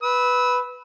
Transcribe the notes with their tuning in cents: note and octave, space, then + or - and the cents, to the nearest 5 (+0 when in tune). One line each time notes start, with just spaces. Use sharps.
B4 +0 E6 -25